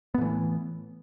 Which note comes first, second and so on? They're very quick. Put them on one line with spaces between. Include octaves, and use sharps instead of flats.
B3 A2 E3